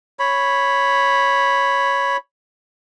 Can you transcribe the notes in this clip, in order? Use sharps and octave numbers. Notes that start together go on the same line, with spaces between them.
C#5 B5